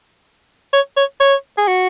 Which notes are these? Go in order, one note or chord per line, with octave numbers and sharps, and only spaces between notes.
C#5
C#5
C#5
G#4
F#4